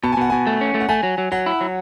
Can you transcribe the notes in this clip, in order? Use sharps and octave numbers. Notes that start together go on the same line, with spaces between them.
B2 A5
G#5
B2 F#5
B2 G#5
A3
C#4
A3
F#5
A3 G#5
F#3
F#3
F#3 F#5
E4
F#3